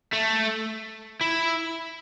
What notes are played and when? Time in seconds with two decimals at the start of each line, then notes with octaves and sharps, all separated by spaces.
0.13 A3
1.21 E4